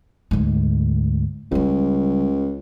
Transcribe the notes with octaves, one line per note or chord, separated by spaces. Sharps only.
D2 G#2
C#2 C#3 G3